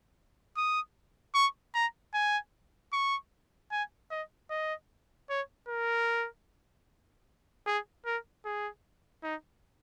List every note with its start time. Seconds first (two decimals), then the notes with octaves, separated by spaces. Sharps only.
0.57 D#6
1.35 C#6
1.74 A#5
2.14 G#5
2.93 C#6
3.71 G#5
4.10 D#5
4.50 D#5
5.30 C#5
5.68 A#4
7.66 G#4
8.05 A#4
8.45 G#4
9.23 D#4